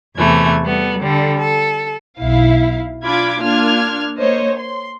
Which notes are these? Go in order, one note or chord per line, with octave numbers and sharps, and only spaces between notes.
E2 C3 E3 A3 G#6
G3 B3 A4
D3 G3 A4
A4
B1 E4 F5
D4 F4 B5 D6 G#6
A#3 D4 F4 F6 G#6
A#3 C5 C#5 D#5
C6